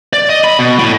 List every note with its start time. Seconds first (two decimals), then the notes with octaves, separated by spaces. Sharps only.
0.13 D5
0.29 D#5
0.44 B5
0.59 B2
0.79 A2